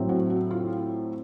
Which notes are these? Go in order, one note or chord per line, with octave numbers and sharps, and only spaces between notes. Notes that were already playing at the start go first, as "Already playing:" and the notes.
Already playing: A2 F#3 C4
F#4
F#4
F4